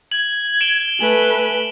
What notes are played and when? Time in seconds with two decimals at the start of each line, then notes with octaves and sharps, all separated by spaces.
0.12 G#6 F#7
0.61 D7 E7 G7
1.00 A3 B4 G#5 F#7